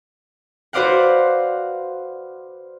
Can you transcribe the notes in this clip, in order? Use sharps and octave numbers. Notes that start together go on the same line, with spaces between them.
F#4 B4 C5 D5 F5 F#5